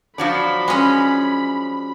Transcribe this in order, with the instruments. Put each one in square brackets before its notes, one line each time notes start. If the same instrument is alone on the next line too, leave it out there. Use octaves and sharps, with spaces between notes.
[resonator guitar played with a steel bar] F3 F#3 D4 [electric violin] B5
[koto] G#3 C#4